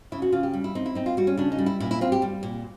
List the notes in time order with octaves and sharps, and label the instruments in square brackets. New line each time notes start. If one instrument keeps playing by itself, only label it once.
[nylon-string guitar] C#3 E4
F#4
C#3 F4
G4
G3
E4
C4 D#4
E4
C4 D#4
F4
G3 F#4
C#4
C#3 D4
D#4
G3
E4
A#2 E4
E4
C4 F4
G4
G3
A#2